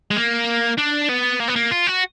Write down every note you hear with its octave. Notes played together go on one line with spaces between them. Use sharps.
G#3
A#3
D4
B3
A#3
B3
A#3
F4
F#4